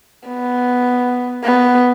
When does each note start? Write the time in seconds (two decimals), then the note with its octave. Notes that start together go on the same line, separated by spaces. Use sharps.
0.28 B3
1.44 B3